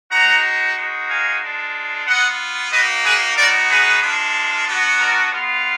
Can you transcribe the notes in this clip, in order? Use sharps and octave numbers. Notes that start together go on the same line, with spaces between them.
G#3 D#4 F#4 F#5 A#5
G#3 D#4 F#4
F5 G#5
G#3 D4 F4
B3 F4 D#5 F#5
A#3 D#4 F#4 B4 D#5
G#4 B4
B3 D#4 F#4 A#4 D5
G#4 B4
G#3 D4 F4
B3 D4 F#4
A#4 D5
G#3 B3 F4